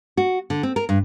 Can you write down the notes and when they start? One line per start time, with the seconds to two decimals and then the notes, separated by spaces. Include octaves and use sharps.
0.17 F#4
0.50 D3
0.63 C4
0.76 A#4
0.89 G2